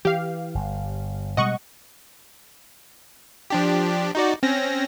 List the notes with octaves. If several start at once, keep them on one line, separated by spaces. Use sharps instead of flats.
E3 G4 F5
G1
B2 G3 G#3 D#5 F#5 C#6
F3 D4 G4
D#4 F#4 D5
C4 C#4 A#6